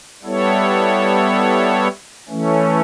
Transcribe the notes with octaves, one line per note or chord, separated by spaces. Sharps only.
G3 B3 E4 A4 C#5
E3 A3 C#4